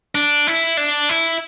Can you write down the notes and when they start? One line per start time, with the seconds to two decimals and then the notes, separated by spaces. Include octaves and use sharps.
0.15 D4
0.47 E4
0.77 D4
1.09 E4